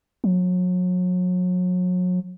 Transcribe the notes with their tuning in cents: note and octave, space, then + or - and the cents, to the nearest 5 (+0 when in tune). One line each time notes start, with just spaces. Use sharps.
F#3 -35